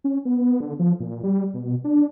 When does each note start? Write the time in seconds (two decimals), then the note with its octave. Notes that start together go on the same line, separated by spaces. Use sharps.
0.04 C#4
0.25 B3
0.61 D3
0.79 F3
1.00 A#2
1.23 G3
1.54 B2
1.84 D4